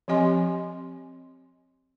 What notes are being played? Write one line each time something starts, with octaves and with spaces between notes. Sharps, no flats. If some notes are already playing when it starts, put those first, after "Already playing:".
F3 C4 G4 D#5 G#5 C6